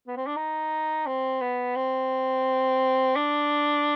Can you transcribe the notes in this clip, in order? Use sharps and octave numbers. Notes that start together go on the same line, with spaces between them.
B3
C4
D4
D#4
C4
B3
C4
D4